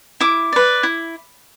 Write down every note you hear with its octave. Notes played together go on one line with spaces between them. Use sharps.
E4 D6
B4 D5
E4